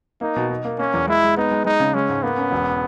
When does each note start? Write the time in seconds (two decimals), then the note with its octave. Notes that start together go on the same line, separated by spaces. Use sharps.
0.21 A#3 D#4
0.36 B2
0.50 D#4
0.65 A#3
0.79 A#3 C#4
0.94 E2
1.07 G#3 E4
1.23 G#3
1.37 B3 D#4
1.51 G#3
1.65 G#3 D#4
1.80 C#3
1.94 G#3 C#4
2.09 G#2
2.23 A#3 B3
2.37 C#4
2.51 E1